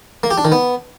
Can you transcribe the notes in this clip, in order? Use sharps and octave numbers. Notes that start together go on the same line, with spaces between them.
A#3
G4
D4
D#3
B3